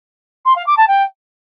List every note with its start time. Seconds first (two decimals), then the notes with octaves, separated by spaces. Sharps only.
0.45 C6
0.56 F5
0.66 D6
0.77 A5
0.87 G5